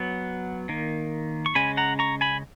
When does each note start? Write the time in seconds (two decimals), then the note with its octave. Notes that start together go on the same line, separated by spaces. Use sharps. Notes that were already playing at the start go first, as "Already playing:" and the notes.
Already playing: F#3 B3
0.69 D#3 A#3
1.46 C#6
1.55 C#3 G#3 C#4 G#5 B5
1.77 F#5 A#5
1.99 A#5 C#6
2.21 G#5 B5